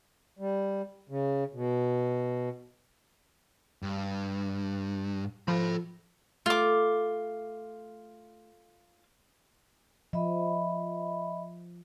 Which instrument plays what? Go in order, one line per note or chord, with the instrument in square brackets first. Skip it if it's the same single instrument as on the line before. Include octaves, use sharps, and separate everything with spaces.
[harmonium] G3
C#3
B2
[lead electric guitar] G2
[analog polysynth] F3 [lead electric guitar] A4 B5
[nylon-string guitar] A3 [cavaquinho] F4 D6
[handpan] F3 [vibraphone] D#5 E5 B5